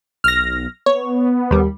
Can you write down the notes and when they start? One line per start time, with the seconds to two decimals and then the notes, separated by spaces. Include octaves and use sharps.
0.24 B1 F6 A#6
0.86 B3 C#5
1.51 D#2 G3